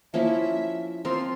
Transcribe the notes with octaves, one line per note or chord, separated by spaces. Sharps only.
F3 A#3 C#4 E4 E5
F3 C4 F4 A#4 C6